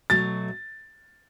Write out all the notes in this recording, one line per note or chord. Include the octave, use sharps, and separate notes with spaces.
B2 F#3 A3 A6